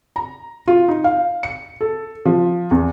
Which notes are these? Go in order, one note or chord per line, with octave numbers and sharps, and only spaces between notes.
A#5
F4
D#4
F5
C#7
A4
F3
E2